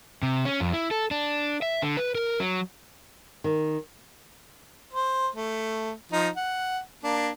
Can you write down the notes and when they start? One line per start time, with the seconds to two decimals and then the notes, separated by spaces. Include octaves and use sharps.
0.23 C3
0.45 C#4
0.60 F2
0.73 E4
0.91 A4
1.11 D4
1.62 E5
1.82 D3
1.97 B4
2.15 A#4
2.40 F#3
3.44 D#3
4.93 C5
5.35 A3
6.12 F3 D#4
6.37 F#5
7.04 A#3 D4